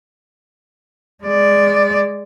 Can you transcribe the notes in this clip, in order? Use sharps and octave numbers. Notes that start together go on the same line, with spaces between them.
G#3 D5